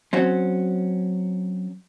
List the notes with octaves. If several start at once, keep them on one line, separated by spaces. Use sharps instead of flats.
F#3 C4 C#4